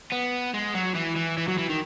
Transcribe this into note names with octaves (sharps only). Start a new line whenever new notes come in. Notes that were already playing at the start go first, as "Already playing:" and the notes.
B3
G#3
F#3
E3
E3
E3
F#3
E3
D#3